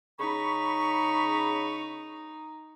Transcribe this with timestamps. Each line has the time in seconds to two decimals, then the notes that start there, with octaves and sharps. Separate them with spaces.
0.19 C#3 D#4 B5 C#6